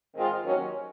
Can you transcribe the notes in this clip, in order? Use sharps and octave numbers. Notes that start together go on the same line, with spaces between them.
G#2 D#3 G#3 C4 F4
D#2 D#3 F#3 C#4